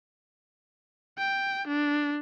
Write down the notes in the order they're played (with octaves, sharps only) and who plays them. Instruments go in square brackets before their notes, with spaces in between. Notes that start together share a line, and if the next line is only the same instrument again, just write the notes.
[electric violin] G5
D4